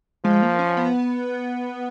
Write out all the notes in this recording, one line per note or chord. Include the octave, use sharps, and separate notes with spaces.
F3 G#3
A#3
C#4
B3